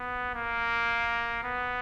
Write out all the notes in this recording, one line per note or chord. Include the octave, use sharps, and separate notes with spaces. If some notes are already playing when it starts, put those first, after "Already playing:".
Already playing: B3
A#3
B3